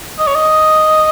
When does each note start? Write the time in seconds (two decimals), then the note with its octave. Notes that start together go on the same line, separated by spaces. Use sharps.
0.19 D#5
0.27 C#5
0.35 D#5